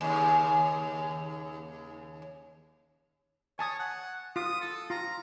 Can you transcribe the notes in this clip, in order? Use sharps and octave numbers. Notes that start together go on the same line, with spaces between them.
D#2 C#3
C#5 G#5 A5 D#6
F#5
F4 D#6
A4
F4 A#5